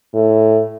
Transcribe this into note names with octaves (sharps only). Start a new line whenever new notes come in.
A2